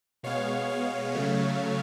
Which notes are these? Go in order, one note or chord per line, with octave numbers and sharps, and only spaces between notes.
B2 G#3 B3 C#5 F5
C#5 F5
C#3 F#3 A3